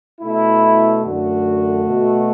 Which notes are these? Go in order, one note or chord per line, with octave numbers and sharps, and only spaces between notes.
B2 A3 E4
F#2 D3 A3 F#4
B2
A3